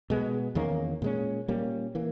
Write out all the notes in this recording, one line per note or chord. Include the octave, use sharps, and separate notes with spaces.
B2 G#3 B3
E2 D#3 A#3 C#4
A#2 G#3 C#4
A#2 G3 A#3 C#4
E3 A#3